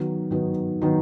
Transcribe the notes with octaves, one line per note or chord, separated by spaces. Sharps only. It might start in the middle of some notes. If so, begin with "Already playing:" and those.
Already playing: D#3 F#3 B3 D#4
D#3 F#3 B3 D#4
D#3 F#3 B3 D#4